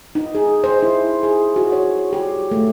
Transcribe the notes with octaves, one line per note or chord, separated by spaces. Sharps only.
D#4
G#4
C5
E4
G#4
F#4
C#5
G4
A3